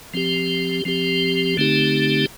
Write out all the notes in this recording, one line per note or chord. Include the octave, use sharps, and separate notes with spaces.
F3 C4 G4
F3 C4 G4
D3 A3 C4 D#4 G4